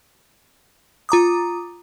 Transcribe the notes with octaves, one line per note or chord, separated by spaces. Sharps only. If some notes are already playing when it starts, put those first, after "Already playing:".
F4 A#5 D6 D#6